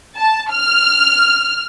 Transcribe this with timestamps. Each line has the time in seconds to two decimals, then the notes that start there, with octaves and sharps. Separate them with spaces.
0.16 A5
0.51 F6